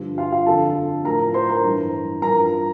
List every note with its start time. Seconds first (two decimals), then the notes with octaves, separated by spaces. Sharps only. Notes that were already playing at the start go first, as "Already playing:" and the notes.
Already playing: G2 D3 F3 G4
0.18 F4 F5
0.32 F4 F5
0.46 F2 D3 F3 A4 A5
1.05 A2 F3 A#4 A#5
1.34 C5 C6
1.49 A#4 A#5
1.64 G2 E3
2.22 G2 F3 A#4 A#5